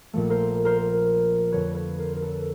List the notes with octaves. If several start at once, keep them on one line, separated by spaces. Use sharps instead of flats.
A#1 A#2 F3 A3
A#4 C5
A#4 C5
F2 D3 F3 B4 C#5
B4 C#5
A#4 C5
A#4
A4 B4